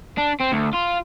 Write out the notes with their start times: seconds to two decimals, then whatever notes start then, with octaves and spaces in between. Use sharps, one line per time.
0.18 D4
0.41 C4
0.53 D2
0.74 F4